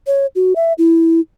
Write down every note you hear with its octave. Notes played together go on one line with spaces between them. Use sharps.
C#5
F#4
E5
E4